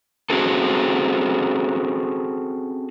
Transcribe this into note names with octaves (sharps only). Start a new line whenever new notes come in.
C4 C#4 F#4 G#4 A4